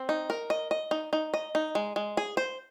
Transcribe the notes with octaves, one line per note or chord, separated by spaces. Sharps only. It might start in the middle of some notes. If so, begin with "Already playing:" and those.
Already playing: C4
D#4
A#4
D#5
D#5
D#4
D#4
D#5
D#4
G#3
G#3
G#4
C5